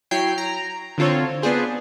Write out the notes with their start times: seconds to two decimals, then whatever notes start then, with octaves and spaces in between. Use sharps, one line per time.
0.11 F#3 E4 C#5 G5 C7
0.38 A#5
0.98 D3 C4 F4 A4 C#5
1.42 B3 D4 F4 G#4 C5